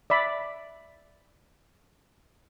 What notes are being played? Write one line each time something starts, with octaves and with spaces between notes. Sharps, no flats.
D5 E5 B5